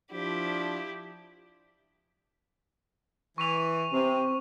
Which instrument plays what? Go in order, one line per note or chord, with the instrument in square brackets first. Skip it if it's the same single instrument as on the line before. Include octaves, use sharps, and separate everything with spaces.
[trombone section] F3 D4 [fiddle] E4 G4
[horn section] E3 [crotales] C#6 D#7 F7
[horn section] C3 [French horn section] C4